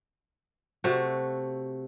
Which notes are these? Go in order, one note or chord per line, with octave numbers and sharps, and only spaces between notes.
C3 A3 F#4